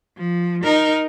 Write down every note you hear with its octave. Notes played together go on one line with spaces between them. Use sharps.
F3
D#4 A#4